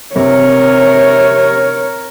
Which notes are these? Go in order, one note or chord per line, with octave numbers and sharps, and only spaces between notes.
C3 A#4 C#5